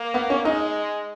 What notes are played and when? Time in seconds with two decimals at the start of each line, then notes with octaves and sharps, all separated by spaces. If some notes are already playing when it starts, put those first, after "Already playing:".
Already playing: A#3
0.14 B3
0.30 C#4
0.45 G#3 D#4